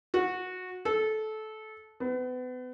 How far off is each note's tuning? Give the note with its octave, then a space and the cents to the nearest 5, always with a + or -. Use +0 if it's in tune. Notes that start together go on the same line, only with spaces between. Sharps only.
F#4 -15
A4 -20
B3 +35